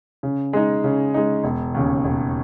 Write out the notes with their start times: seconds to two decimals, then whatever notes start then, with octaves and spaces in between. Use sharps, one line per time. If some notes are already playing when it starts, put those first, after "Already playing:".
0.23 C#3
0.53 G#3 D#4
0.84 C#3
1.14 G#3 D#4
1.44 E1
1.74 D#2 C#3
2.05 E1